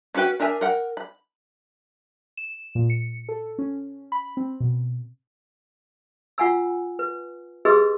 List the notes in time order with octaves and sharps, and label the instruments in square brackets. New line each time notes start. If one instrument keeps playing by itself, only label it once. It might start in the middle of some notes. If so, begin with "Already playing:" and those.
[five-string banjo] C#4 F4 F#4 B4 G5
D4 A#4 E5 G#5
A#4 F#5 G5
B5
[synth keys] E7
A#2
C#7
A4
C#4
B5
C4
B2
[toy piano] F4 F#5 G#5 B5 E6
B4
G4 G#4 B4 D#5 C6 E6